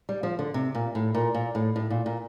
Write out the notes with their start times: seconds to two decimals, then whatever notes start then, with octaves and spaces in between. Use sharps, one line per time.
0.09 G3
0.23 F3
0.39 D3
0.54 C3
0.75 A#2
0.95 A2
1.15 A#2
1.35 A#2
1.55 A2
1.76 A2
1.90 A#2
2.06 A#2